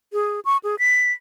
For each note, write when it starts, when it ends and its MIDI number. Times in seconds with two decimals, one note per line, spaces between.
0.13 0.40 68
0.45 0.57 85
0.64 0.75 68
0.79 1.12 95